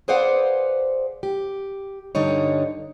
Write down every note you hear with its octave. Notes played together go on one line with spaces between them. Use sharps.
G#4 B4 C5 D5 F5 F#5
G4
G2 D3 G3 D#4 C#5